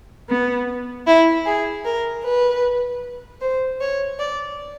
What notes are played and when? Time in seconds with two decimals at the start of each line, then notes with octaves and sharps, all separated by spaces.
0.28 B3
1.06 E4
1.45 G#4
1.85 A#4
2.24 B4
3.41 C5
3.80 C#5
4.19 D5